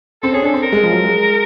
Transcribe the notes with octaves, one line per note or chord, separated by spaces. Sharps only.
C4 A4
C#4 G#4
D4 A4
C4
A#4
G#3
F3
F#3
G#3